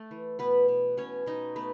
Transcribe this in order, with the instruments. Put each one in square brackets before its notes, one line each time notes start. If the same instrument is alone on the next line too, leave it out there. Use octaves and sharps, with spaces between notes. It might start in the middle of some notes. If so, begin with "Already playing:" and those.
Already playing: [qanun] A3 A4
E3
B2 B3 B4
B2
B2 C#4 C#5
B2 D#4 D#5
A3 B3 B4